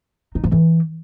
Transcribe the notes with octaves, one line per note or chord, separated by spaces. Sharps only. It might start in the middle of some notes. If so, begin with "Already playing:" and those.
D#4
F3
E3